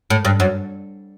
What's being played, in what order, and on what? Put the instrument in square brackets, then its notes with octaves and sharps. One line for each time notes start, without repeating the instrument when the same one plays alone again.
[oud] A2
G2
F#2